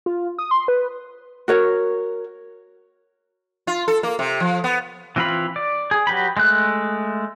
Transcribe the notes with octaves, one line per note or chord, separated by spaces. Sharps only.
F4
D#6
C6
B4
F#4 A#4 C#5
F4
A4
A#3
C3
F3
B3
E3 C4 F4 F5 B5
D5
G#4
F#3 G4 B4 B5
G#3 A3 F#6